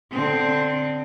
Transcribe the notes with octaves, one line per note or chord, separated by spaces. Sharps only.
D3 C4